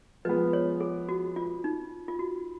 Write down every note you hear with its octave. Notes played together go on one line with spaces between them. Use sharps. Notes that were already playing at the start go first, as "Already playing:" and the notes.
F3 G#3 B3 B4
C#5
G#4
F#4
F4
D#4
F4
F#4